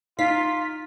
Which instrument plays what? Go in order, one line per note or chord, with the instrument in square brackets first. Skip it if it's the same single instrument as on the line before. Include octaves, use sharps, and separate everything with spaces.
[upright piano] D#4 [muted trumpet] F4 [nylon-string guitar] F5 [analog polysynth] B6